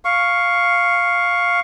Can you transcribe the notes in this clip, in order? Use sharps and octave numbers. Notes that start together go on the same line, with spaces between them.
F5 C#6